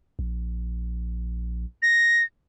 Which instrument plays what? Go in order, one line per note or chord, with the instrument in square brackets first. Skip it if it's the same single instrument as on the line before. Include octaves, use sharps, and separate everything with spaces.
[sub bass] A#1
[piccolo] A#6